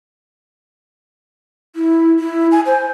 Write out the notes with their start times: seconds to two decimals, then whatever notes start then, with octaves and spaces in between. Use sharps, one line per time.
1.76 E4
2.19 E4
2.52 G#5
2.66 C5